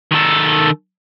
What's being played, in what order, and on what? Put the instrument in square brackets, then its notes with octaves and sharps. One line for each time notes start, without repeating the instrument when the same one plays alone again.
[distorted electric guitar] D#3 A4